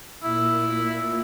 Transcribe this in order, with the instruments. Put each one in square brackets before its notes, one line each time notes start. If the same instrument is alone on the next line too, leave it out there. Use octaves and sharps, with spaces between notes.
[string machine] A#2 [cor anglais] E4